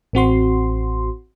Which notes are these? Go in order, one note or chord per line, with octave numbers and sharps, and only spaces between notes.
A1 C4 F#4 C6